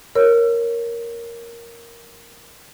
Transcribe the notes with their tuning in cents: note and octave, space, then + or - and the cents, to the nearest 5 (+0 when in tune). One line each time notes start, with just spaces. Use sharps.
A#4 +0 C#5 -5 E6 +40